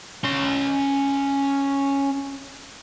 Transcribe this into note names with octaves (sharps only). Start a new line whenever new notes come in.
C#4 C6